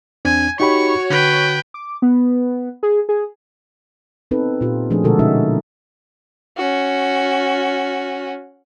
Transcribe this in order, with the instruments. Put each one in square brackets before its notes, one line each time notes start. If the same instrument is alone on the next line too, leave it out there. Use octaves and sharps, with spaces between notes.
[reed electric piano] E2 C4 D4 [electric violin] G#5
[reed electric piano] D#4 G4 B5 [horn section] F#4 C#5 [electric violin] C#6
[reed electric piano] D3 [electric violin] B4 G5
[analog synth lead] D6
B3
G#4
G#4
[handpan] B3 C4 D#4 A4 B4
A#2 F4 G4
F3 A3 D4 G#4
B2 D3 G#3 F#4 A4 A#4
G#3 A3 C#4 D#4 F#4 E5
[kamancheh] C#4 F#4